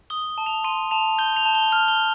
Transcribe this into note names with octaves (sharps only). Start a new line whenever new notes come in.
D#6 G7
A5
F7
C6 D#7
A5 F7
G6 G7
F7
A5
G7
F6 F7
G7